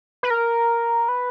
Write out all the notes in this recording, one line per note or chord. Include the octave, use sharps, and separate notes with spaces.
B4
A#4
B4